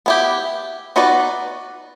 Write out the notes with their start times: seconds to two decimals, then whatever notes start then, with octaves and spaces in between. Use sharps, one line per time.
0.06 B3 E4 G4
0.96 B3 D#4 F#4 B4 D5